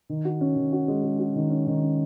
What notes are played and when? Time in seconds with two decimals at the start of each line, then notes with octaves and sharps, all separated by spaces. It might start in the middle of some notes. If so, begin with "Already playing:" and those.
0.09 D#3
0.25 F#4
0.41 C#4
0.56 D#3
0.73 F#4
0.88 G#3
1.03 G#3
1.19 F#4
1.36 D#3
1.50 C#4
1.67 D#3
1.82 C#4